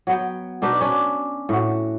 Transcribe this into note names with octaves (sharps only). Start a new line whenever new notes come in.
F#3 B3 G5
B2 D4 D#4 B4
C#4 D4
A2 F#4